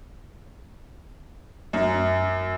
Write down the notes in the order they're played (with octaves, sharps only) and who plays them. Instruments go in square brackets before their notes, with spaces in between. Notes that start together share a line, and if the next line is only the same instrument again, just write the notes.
[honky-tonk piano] F#2